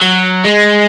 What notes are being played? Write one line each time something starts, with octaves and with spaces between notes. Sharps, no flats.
F#3
G#3